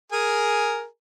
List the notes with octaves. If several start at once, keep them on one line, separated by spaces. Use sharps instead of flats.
G#4 A#4 G#5